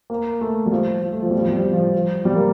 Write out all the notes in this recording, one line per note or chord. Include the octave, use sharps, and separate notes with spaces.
A#3
A3
G3
F3
F3
A3
F3
G3
F3
G3
F3
G3
F3
F3
G3
A#3